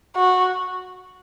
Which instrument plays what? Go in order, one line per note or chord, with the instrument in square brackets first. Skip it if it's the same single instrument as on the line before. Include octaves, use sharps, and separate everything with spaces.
[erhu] F#4